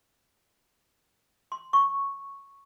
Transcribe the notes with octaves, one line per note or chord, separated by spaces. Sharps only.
C6
C#6